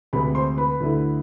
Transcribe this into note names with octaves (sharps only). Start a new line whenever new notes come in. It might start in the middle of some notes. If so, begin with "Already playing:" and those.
D2 C3 G#3 B4 B5
C5 C6
B4 B5
D2 D3 A3 E4